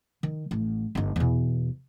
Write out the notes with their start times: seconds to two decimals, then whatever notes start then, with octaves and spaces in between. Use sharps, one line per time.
0.23 D#3
0.51 A1
0.95 G1 D#4
1.16 E2 B2